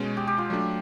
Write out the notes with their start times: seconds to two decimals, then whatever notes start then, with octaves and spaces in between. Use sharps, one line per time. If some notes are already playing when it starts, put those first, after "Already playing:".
Already playing: B2 G#3 C#4
0.17 G4
0.27 G4
0.38 F4
0.50 F#3 A3 D4